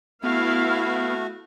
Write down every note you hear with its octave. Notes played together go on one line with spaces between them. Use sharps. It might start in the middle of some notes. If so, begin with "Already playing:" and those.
A3 B3 E4 F#4 F5